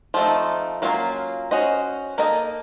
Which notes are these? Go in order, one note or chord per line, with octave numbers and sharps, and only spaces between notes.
F3 A3 C4 D#4
F#3 A#3 C#4 F4
C#4 F#4 C5 D#5
A#3 D#4 A4 D#5